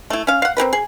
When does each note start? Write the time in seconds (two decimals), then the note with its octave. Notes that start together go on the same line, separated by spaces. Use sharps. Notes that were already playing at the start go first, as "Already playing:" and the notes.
0.10 A3 E4
0.27 C#4 F5
0.42 F5 F#5
0.57 C4 G4 A#4 B4
0.73 G#4